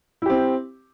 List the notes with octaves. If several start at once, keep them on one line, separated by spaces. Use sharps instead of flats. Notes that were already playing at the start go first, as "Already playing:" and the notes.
C4 E4 G4